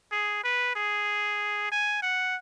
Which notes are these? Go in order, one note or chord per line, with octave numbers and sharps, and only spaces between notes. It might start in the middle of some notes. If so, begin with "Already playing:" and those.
G#4
B4
G#4
G#5
F#5